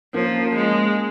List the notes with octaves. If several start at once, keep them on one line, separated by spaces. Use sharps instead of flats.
F3 A#3 C#4
G#3